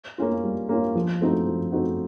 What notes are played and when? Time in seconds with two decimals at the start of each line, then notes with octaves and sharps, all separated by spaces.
0.18 A#3 C#4 F4
0.44 G3
0.69 A#3 C#4 F4
0.95 F3
1.21 A3 C4 D#4 F#4
1.47 F3
1.72 A3 C4 D#4 F#4